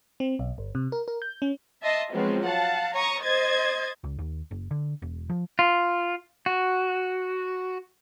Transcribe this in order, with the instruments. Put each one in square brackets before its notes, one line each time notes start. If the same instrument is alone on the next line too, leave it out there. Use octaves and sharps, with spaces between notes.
[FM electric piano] C4
B1
G1
C3
A#4
A#4
G6
C#4
[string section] D#5 E5 A5 C6 D#6
F3 F#3 G#3 B3 C4
F5 F#5 A5
C#5 A#5 C#6 D#6
C5 D#5 G#6 A6
[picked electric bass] C#2
D#2
F#1
D3
E1
F3
[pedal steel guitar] F4
F#4